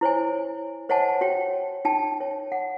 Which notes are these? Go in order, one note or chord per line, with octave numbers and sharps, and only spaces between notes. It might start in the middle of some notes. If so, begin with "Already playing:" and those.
E4 C5 C#5 G#5
C5 C#5 D#5 F#5 G#5 A5
F#4 C#5 G5
D#4 G5 A5
C#5
F#5